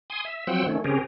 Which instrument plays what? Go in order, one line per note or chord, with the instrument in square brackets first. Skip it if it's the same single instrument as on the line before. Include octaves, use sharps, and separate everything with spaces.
[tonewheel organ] G#5 C6 D#6
E5
F3 F#3 C4 F#5 G5 E6
D#3 A3 C#4
C#3 C4 C#4 G4 G#4 A#4